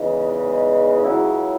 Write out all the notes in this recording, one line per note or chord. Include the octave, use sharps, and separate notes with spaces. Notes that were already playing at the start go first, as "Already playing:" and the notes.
Already playing: E2 C#3 E3 G#3 D#4
C#2 C#3 F#3 C#4 E4